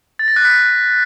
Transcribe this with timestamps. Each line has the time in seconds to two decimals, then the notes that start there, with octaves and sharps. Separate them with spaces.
0.19 A6
0.28 A#6
0.36 F#6
0.45 B6